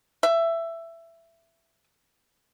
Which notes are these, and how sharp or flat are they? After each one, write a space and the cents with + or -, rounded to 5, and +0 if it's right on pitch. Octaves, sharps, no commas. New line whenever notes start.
E5 +15